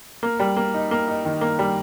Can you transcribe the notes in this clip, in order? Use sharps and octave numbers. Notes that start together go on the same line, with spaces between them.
A#3
G3
A#3
D#4
A#3
D#4
D#3
A#3
G3